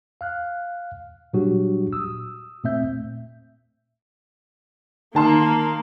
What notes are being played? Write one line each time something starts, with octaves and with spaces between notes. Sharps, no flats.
F5 F6 F#6
A#2 F#3 G3 D4 F#4 G4
D#6 E6
A#2 A3 C4 E5 G6
D#3 A#3 A5 C6